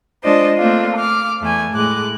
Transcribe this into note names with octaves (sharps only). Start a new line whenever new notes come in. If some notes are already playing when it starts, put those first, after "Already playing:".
G#3 D4 F4 C5 D#5
A3 A#3 C4 D4 F4
D6 F6
E2 A3 G#5
A2 G#3 D6 F#6